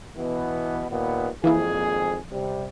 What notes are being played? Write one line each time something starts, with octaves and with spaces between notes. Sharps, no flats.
B2 E3 B3
D#2 A#2 B3
G#1 F2 E3 A#3 E4 G#4
C3 G3